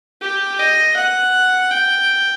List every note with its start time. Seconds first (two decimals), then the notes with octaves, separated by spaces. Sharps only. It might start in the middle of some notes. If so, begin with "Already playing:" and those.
0.21 G4
0.59 D#5
0.96 F#5
1.71 G5